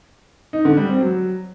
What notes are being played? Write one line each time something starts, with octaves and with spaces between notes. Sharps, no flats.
D#4
D3
G3
C4
F#3